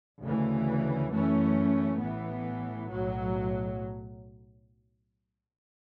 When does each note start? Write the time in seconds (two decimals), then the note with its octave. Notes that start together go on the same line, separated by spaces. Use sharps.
0.22 D2 C#3 E3
1.11 F#2 E3 A3 C#4
1.99 A1 A2 E3 B3
2.89 B1 A2 F#3